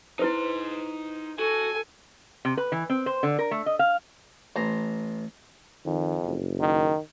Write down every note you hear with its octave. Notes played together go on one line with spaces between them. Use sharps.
D#4 E4 B4 C5 C6
F#4 A4 G#5
C3
B4
E3
C4
C5
D3
A#4
A3
D#5
F5
A1 C5 A#5
F2 D#3
F#1
D#3